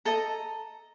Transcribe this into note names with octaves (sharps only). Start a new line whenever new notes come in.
A4 D#5 A#5